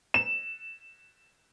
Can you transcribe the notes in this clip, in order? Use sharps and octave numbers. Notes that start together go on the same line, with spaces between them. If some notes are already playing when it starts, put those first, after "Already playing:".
E7